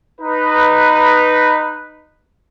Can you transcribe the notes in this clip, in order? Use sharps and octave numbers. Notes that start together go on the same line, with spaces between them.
D#4 B4